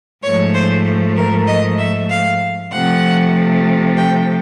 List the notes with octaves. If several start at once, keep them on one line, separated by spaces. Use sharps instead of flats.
G#2 F3 A3 C#5
C5
A#4
D#5
E5
F5
C3 F3 A3 F#5
G5